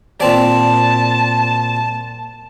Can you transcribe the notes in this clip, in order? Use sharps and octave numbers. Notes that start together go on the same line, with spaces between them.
A#2 C4 D5 A5